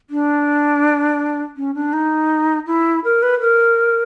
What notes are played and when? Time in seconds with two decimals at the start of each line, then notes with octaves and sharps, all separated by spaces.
0.10 D4
1.57 C#4
1.75 D4
1.93 D#4
2.67 E4
3.04 A#4
3.23 B4
3.40 A#4